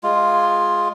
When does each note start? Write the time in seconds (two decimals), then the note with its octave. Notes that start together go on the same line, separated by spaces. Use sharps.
0.03 G#3 F4